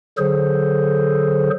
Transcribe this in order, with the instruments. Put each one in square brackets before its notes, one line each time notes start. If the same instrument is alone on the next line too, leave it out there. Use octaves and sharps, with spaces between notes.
[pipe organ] D3 F#3 G#4 A4 C5